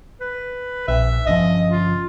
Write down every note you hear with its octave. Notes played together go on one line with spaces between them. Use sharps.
B4
A#1 E5
G1 C#3 F3 D#5
F4